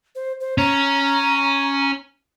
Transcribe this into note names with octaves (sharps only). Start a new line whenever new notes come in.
C5
C5
C#4 A#5